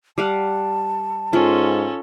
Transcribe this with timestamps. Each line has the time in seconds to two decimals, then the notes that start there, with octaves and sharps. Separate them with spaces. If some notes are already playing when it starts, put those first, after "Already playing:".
0.18 G3 F5 F#5 A5
1.33 G#2 C#4 F4 A4